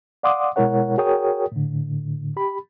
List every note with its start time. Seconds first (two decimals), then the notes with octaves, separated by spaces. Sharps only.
0.23 D5 F5 F#5 C6 D6 D#6
0.56 B2 G#3 E4 A#4 C#5 F#5
0.98 F#4 G#4 A#4 C#5 G5 D#6
1.52 A2 D3
2.37 G4 B5